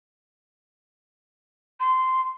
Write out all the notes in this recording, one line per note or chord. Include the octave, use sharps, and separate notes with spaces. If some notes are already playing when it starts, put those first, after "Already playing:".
C6